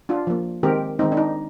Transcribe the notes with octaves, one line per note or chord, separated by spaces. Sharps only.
D4 F4
F3 A#3
D#3 G#3 C4 G4 A#4
D#3 G#3 C4 D#4
D4
D#4